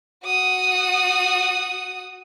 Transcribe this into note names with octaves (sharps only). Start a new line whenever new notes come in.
F#4 D#6